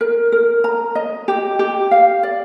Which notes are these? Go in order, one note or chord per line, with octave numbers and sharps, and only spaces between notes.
A#4
A#4
A#5
D#5
G4
G4
F5
D5